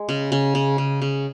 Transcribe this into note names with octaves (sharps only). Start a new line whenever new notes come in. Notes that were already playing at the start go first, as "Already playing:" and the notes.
Already playing: G#3
C#3
C#3
C#3
C#3
C#3